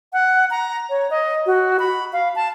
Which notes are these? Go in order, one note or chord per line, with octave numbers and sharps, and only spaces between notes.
F#5
A#5
C#5
D#5
F#4
B5
F5
A5